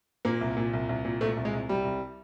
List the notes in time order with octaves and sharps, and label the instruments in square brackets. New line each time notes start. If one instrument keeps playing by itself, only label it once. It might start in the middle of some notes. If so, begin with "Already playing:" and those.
[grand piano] A#2 A#3
C2
A#2
C2
C2
A#2
A#2 A3
C2
G#3
C2
C2 G3
C2